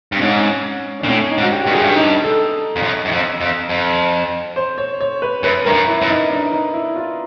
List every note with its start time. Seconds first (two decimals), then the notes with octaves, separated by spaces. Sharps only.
0.12 G2
0.17 C4
0.21 G#2 C#4
1.00 D4
1.04 A#2
1.08 A2 C#4
1.30 D#4
1.38 G#2
1.43 F#4
1.52 G4
1.64 G2 G4
1.74 F#2 G#4
1.84 G2
1.95 D#4
2.24 A4
2.76 F2
2.82 F#2
3.05 F#2
3.12 F2
3.41 F2
3.69 F2
4.56 C5
4.78 C#5
5.01 C#5
5.22 B4
5.43 F#2 B4
5.65 G2 A#4
5.72 F#2
5.87 E4
6.02 F#2
6.08 D#4
6.30 D4
6.52 D#4
6.74 E4
6.96 F4